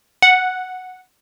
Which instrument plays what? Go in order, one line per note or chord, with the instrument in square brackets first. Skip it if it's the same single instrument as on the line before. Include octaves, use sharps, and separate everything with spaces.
[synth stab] F#5